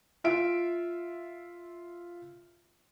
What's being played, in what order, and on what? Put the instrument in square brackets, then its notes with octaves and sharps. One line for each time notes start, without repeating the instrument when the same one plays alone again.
[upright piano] F4 E5 D7